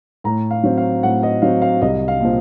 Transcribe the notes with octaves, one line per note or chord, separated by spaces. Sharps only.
A2 A#5
F5
F#3 C4
F5
A2 F#5
D#5
F#3 C4 F5
F5
C2 D#5
F5
A#2 F3